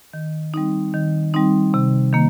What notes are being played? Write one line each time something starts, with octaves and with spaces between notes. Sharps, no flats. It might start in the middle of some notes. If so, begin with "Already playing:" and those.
D#3
G3 C4 D#4
D#3
G3 C4 D#4
C3
D#3 A#3